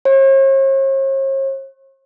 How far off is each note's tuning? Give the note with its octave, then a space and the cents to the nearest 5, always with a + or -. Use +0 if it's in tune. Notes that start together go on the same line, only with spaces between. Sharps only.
C#5 -45